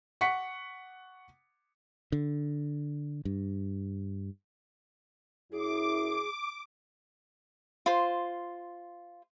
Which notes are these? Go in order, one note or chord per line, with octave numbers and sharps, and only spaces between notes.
F#5 C#6 B6 C#7
D3
G2
F#2 E4 G#4 D6
F4 C5